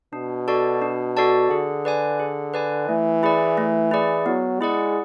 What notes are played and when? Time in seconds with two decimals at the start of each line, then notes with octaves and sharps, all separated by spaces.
0.13 B2 D4
0.48 F#4 A4 D5 A5
0.82 D4
1.17 F#4 A4 D5 A5
1.50 D3 G#4
1.85 B4 D5 G#5
2.19 G#4
2.54 B4 D5 G#5
2.88 E3 A3
3.23 E4 G#4 D5
3.57 A3
3.91 E4 G#4 D5
4.26 F#3 B3
4.61 G#3 E4 G#4 D5 F#5